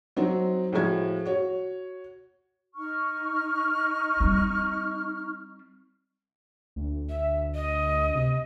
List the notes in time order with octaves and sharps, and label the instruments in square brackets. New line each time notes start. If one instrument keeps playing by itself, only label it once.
[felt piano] F#3 C4 D#4 F#4
A2 F3 G#3 F#4 G#6
F#4 C#5
[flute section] D#4 C#6 F6
[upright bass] G3 C4
[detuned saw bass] D2
[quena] E5
D#5
[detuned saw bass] C3